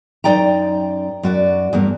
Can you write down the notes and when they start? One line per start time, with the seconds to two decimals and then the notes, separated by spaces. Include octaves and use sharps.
0.24 F#2 C4 D#4 D5 G5 A#5
1.23 F#2 F#4 D5
1.73 E2 G2 A#3